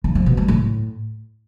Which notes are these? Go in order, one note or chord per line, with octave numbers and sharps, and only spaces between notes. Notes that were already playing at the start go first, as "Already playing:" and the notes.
G2
F3
B2
G3
A2